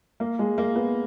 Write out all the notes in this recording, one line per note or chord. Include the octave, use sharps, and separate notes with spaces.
A#3
G#3
A#3
B3